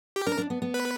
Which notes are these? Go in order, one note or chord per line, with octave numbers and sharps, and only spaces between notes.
G4
D4 A#4
D4
B3
B3
B4